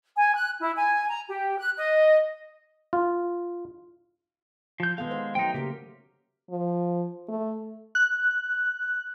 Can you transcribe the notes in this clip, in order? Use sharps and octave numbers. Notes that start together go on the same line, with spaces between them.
G#5
F#6
E4
G#5
A#5
G4
F#6
D#5
F4
F3 G6
D#3 G#3 B3 A4 F5
C5
F#3 A3 D#4 C5 G5
C#3 A#3 G4 A#4
F3
A3
F#6